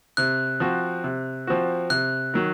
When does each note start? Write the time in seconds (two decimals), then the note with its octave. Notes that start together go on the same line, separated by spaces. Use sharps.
0.17 C3 F#6
0.60 F3 C4 F#4
1.04 C3
1.47 F3 C4 F#4
1.90 C3 F#6
2.34 D#3 F#3